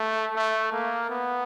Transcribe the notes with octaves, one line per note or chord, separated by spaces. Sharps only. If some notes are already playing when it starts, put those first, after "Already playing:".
Already playing: A3
A3
A#3
B3